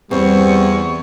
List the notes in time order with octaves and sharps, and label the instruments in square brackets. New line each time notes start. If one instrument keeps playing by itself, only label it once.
[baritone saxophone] E2 [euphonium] G3 [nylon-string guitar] C4 [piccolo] C#6